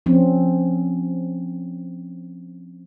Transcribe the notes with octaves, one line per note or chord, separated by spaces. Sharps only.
F3 C4 C#4